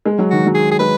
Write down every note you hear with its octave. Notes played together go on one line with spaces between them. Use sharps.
G#3
F#3
D#3 F#4
F#3
G#4
G#4
G#3 B4